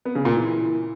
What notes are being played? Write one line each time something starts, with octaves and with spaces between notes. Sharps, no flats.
B3
C#3
A#2
E3